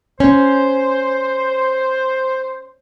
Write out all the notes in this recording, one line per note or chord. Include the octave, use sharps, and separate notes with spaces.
C#4 C5